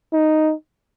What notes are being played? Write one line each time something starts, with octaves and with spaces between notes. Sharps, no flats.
D#4